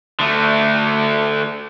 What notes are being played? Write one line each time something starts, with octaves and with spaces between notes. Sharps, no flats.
D3 A3